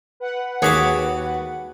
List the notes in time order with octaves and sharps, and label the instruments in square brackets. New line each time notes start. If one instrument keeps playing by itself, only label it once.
[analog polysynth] B4 F#5
[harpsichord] D#2 B5 D6 [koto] F#4 G#4 C#5